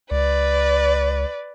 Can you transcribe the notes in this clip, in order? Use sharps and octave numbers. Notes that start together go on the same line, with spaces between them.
C#2 B4 D5